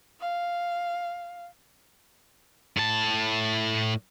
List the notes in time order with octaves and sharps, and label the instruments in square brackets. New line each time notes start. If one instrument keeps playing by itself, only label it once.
[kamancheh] F5
[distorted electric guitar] A2 A5